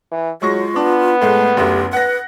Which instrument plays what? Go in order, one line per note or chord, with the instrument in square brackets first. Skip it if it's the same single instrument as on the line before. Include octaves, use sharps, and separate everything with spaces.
[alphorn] E3
[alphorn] F#3 [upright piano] G#3 C#6 A#6 [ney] F4
[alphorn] B3 [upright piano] D4
[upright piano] A2 G#3 [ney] A3
[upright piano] F#1 D2 [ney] G4
[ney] B4 [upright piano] F#5 A#6